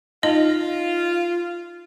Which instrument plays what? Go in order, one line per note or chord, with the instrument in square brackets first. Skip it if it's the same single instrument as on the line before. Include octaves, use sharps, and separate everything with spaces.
[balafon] D#4 D#5 [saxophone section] F4